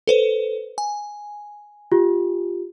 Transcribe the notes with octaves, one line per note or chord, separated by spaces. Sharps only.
A4 B4 C5
G#5
F4 G4